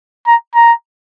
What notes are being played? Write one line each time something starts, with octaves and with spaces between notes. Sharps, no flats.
A#5
A#5